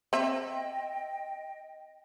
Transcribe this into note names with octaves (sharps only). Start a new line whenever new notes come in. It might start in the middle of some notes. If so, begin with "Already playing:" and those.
C4 D#5 E5 G5